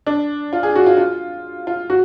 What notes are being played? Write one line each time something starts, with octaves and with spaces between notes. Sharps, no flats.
D4
F4
G#4
F#4
F4
F4
F4
F#4